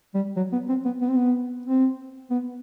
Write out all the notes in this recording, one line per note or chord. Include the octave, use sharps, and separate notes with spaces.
G3
F#3
B3
C4
B3
B3
C4
B3
C4
B3